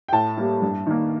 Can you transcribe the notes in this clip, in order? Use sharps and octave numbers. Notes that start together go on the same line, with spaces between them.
G5
A2 A5
G3 A#3
G2
D#3 A#3